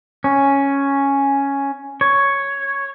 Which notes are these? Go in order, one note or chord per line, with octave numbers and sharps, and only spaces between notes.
C#4
C#5